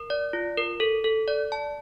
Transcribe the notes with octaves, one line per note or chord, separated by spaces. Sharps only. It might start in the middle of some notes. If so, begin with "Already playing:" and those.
Already playing: A#4
D5
F4
A#4
A4
A4
D5
A5